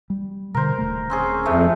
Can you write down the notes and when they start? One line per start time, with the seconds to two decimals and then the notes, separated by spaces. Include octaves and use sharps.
0.10 G3
0.54 B2 D3 A#4 C5
0.78 D#1 A3
1.10 C4 C#4 G#4
1.46 F2 A2 C3 A3